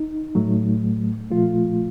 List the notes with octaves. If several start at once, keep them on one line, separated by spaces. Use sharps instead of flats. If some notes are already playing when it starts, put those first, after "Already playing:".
Already playing: D#4
A2 F#3 A3
A#2 F3 A3 F4